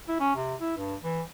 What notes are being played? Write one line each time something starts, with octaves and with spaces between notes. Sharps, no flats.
E4
C#4
C3
E4
G2
E3